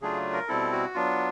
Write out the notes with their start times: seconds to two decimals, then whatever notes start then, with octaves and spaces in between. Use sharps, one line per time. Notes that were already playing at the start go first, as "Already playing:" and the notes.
0.02 C#3 F#3 A3 D4 F4 G#4
0.33 A#4
0.48 B2 G3 C4 E4 A4
0.72 F#4
0.94 F#3 B3 D4 F4